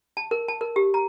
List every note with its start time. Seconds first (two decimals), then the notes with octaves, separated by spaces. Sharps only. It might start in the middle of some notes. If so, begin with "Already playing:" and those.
0.17 A5
0.31 A#4
0.48 A5
0.61 A#4
0.76 G4
0.94 A#5